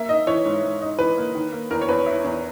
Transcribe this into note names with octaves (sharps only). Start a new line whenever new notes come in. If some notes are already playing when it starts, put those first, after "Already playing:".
Already playing: A#3 E5
D#4 D#5
E3 C#5
G#2
G#2
D#4
E3 B4
A#3
D#3
A#3
E2 A#4
C#5
E2 B4
E4
E2